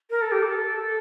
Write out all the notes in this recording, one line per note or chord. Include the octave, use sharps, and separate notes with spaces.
A#4
A4
G4
A4